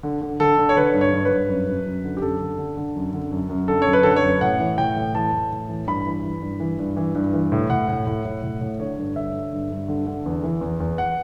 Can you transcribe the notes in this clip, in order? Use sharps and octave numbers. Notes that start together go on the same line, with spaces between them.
D3
D3
D3 A4
D3
C#5
D3 B4
G2
C#5
G2
B4
G2
F#2
F#2
F#2
D3
G4
F#2 A4
D3
D3
D3
F#2
D3
F#2
F#2
D3 A4
C#5
F#2
B4
D3 A4
B4
C#5
F#2
A2 F#5
E3
A2 G5
A2
E3 A5
A2
A2
E3
G2 B5
E3
E3
G2
E3
G2
E3
G2
E3
A2
A2 F#5
A2
A2
A2
A2
A2
D3 C#5
G2
D3 E5
D3
G2
G2
D3
D3
E2
E3
E2
E2
F#5